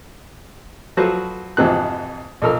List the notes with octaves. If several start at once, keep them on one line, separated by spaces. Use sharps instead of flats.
F3 F#3 F#4 A4 B4 C5
G#1 F2 C3 E3 C4 F#6
B1 F3 A4 A#4 E6 F6